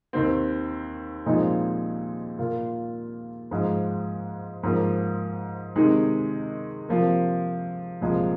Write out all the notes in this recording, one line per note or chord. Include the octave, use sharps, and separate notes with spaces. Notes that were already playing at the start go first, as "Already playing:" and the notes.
D#2 D#3 C4
A#2 F3 G#3 C4 D#4
A#2 A#3 F4
G#2 F3 G#3
G#2 F3 A#3
C3 D#3 G#3 D#4
C3 F3 A#3
C2 A#2 F3 G#3 F4